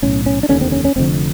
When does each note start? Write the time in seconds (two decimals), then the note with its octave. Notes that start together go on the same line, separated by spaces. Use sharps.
0.02 B1 A2 C#4
0.26 C#4
0.43 D4
0.49 F1 D#2 D3 C#4
0.61 C4
0.72 C#4
0.85 C#4
0.96 F1 F2 D3 C4